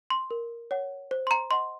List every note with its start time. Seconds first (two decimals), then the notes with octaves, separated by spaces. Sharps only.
0.10 C6
0.31 A#4
0.71 C#5 F#5
1.11 C5
1.27 C6
1.31 A#5
1.51 D#5 F#5 C6